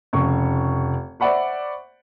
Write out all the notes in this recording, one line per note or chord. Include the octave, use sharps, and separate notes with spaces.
F1 C#3 C#6
C5 D5 E5 F#5 B5 C#6